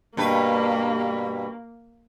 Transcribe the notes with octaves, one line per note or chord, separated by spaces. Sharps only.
G2 B2 A#3 B4